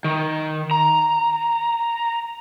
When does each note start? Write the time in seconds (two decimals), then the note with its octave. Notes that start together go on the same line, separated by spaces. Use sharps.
0.04 D#3
0.71 A#5